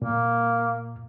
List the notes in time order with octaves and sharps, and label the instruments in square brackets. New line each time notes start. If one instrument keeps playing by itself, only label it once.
[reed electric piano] A#2 [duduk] A#3